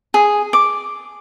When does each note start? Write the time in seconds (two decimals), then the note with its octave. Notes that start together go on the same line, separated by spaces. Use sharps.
0.14 G#4
0.53 D6